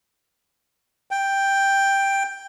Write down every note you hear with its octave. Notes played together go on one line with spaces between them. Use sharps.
G5